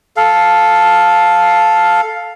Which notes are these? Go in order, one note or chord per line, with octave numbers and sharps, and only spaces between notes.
A4 F5